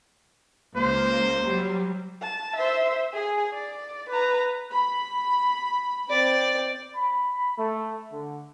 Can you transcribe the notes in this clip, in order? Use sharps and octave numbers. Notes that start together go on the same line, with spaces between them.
C#2 A#3 C5
F#3 G3
A5
C5 E5
G#4 G#5
D5
B4 A#5
B5
C4 D5
B5
A3
D3